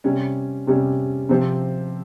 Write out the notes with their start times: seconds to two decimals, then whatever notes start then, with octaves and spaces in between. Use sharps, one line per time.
0.04 C3 G3 C#4
0.67 C3 G3 C#4
1.29 C3 F3 C4 G4